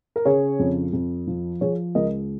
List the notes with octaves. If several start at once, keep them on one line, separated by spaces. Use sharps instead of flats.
A#4
C#3 G#4 C#5
F2
F2
F3
F3 G#4 C#5
C#2 A#4 D#5